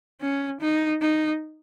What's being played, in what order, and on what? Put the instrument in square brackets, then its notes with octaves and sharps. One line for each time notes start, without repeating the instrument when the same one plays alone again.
[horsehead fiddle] C#4
D#4
D#4